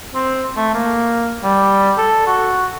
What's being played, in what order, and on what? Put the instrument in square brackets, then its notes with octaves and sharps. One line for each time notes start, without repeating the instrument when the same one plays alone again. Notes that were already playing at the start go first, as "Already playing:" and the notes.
[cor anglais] C4
A3
A#3
G3
A4
F#4